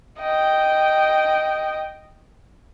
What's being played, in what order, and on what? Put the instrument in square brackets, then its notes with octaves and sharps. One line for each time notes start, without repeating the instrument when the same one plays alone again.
[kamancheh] D#5 G5